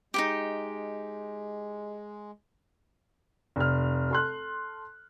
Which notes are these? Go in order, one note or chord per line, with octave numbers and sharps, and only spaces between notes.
G#3 D#4 E4 G4
F1 F6
A4 C6 F#6